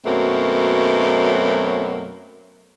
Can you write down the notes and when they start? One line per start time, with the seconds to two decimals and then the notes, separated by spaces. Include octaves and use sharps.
0.05 F#2 B2 F#3 A3 A#3 C4